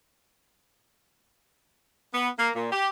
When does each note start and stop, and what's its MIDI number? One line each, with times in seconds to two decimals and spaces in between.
2.14 2.29 59
2.39 2.50 58
2.55 2.68 46
2.72 2.89 67